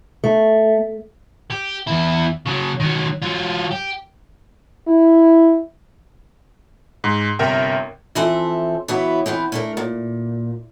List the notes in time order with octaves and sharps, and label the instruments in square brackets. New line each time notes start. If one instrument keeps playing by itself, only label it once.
[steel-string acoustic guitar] A3
[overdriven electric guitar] G4
E2 E4
C#3 F#3
D#3 F#3
F#3 F4
G4
[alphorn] E4
[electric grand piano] G#2
G1 C3 A#4 E5 G5
[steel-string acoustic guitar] E3 F3 C4 A4 C5 E5
E3 F#3 B3 E4
E3 B3 C4
A3 D4 A#4
A#2